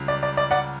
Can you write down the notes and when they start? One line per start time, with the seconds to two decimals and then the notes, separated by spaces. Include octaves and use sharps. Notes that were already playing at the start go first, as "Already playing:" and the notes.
Already playing: C#2 C#3 G3
0.08 D5
0.23 D5
0.37 D5
0.51 D5 F#5